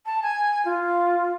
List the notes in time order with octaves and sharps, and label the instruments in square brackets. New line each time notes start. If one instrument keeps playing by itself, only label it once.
[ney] A5
G#5
F4